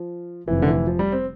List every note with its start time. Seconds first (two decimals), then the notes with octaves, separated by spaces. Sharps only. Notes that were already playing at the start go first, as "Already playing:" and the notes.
Already playing: F3
0.47 F1 F2 C3 E3
0.62 D3
0.67 E3
0.87 F3
0.99 G3
1.12 C4